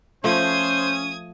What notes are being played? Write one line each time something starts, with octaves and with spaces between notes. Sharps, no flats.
F3 A3 C#4 C5 D#6 G#6